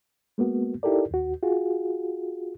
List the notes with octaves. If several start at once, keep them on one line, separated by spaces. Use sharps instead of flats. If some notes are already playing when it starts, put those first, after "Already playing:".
G#3 A#3 B3 F#4
D#4 E4 G4 A4 A#4 D5
D#2 F#4
F4 F#4 G#4